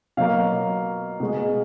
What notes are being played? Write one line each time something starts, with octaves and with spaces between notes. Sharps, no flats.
B2 F#3 A#3 F5
B2 G#3 B3